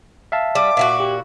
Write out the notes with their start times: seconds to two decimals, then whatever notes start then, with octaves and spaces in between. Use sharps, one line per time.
0.32 E5 F5 A5
0.55 G3 D6
0.77 A#2 E4 F#4
1.00 G4